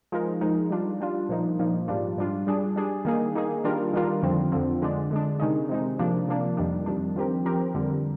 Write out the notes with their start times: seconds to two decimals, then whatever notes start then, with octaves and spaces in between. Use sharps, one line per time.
0.12 F3 G#3 D#4 A#4
0.41 F3 G#3 D#4 A#4
0.71 G3 D4 F4
1.01 G3 D4 F4
1.29 A#2 F3 A#3 D#4
1.59 A#2 F3 A#3 D#4
1.88 G#2 G3 D4 F4
2.17 G#2 G3 D4 F4
2.47 G3 D4 G#4
2.76 G3 D4 G#4
3.05 D#3 A#3 D#4 G#4
3.35 D#3 A#3 D#4 G#4
3.64 D#3 G3 D4 F4 A#4
3.93 D#3 G3 D4 F4 A#4
4.22 F2 D3 F3 C4
4.52 F2 D3 F3 C4
4.82 D3 G#3 D4
5.11 D3 G#3 D4
5.40 C3 D#3 G#3 D#4
5.69 C3 D#3 G#3 D#4
5.98 C3 F3 A#3 D4
6.28 C3 F3 A#3 D4
6.57 F2 D#3 G3 D4
6.86 F2 D#3 G3 D4
7.16 F3 C4 G4 A#4
7.45 F3 C4 G4 A#4
7.74 F2 D3 G3